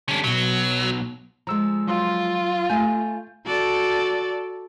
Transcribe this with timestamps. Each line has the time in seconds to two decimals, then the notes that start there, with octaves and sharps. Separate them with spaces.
0.08 D3 G3 C#4 D4
0.24 B1 B2 F#3
1.47 F3 G#3 A#5 E6
1.87 F#3 F4 C6 E6
2.70 A3 G#5 G6
3.45 F#4 A4 D5